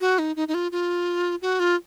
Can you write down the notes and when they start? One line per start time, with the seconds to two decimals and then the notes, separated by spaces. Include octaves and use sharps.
0.01 F#4
0.19 D#4
0.36 D#4
0.48 D#4
0.54 F4
0.72 F4
1.42 F#4
1.60 F4